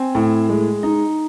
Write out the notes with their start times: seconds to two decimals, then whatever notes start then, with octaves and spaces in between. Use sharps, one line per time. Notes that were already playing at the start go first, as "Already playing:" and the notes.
Already playing: C4 G#5
0.15 A2
0.49 G#3
0.83 D#4